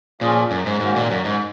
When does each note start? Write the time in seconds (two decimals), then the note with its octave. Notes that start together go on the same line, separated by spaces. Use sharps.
0.21 A#2 F3 A#3 C#4 F4 G#4
0.51 F#2
0.66 G#2
0.80 G#2 D#3 A#3 C#4 F#4 A#4
0.96 A#2
1.11 F#2
1.25 G#2